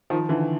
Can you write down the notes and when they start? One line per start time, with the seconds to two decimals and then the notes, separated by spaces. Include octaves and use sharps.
0.10 D#3 F3
0.29 D3 E3